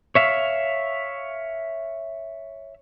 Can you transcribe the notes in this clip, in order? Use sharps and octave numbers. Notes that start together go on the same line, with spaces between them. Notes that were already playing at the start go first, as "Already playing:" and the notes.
C#5 E5 F5